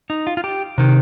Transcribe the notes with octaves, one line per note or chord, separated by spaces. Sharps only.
D#4
F4
F4
G4
C3 D#3